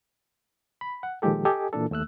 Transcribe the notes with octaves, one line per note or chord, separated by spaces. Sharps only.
B5
F#5
A#2 D#3 F3 G#3 G4 A4
G4 A4 D#5 G#5
A#2 E3 D4 A4
D#2 A3 E6 F#6